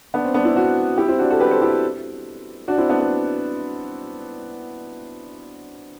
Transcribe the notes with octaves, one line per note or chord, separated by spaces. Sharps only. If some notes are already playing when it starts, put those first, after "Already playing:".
B3 D4
C4
B3 D4
C4 E4
D4 F#4
E4 G4
C4 E4
D4 F#4
F#4 A4
G4 B4
A4 C5
E4 G4
D4 F#4
C4 E4
B3 D4
B3